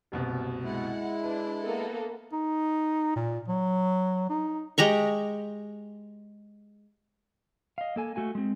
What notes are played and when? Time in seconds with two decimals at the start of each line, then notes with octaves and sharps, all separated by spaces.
0.12 F#1 C2 B2
0.63 G#3 E4 F#5
1.23 D4 B4
1.61 A#3 B3 A4
2.32 D#4
3.15 A#2
3.48 F#3
4.29 D#4
4.78 G#3 G4 A#5 C#6
7.78 D#5 F5
7.96 A#3 A4 G#5
8.16 A3 F#4 G#5
8.35 G#3 C4